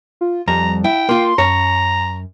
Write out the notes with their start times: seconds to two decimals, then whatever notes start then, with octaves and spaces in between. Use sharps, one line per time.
0.21 F4
0.48 F2 G3 A#5
0.84 E4 G5
1.09 A#3 F4 C6
1.38 F#2 C#5 A#5